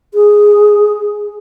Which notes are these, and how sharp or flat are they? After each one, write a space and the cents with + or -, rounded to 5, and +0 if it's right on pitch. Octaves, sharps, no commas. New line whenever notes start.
G#4 +0